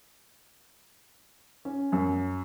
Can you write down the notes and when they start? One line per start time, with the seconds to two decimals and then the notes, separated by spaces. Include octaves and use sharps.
1.65 C#4
1.92 F#2